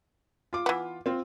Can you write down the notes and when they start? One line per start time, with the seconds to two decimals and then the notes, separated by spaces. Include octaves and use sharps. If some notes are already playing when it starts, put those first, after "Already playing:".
0.53 F4 D6
0.66 E3 B3
1.06 C4 F4